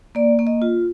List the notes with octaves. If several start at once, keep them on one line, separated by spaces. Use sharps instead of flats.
A#3 D5
A#3
D#5
F4